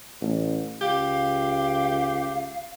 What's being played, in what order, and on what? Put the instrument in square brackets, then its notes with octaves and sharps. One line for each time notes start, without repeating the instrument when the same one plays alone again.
[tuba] A1
[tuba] C#2 [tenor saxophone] G4 [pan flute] F5